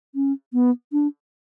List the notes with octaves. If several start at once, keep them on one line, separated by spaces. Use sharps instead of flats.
C#4
B3
D4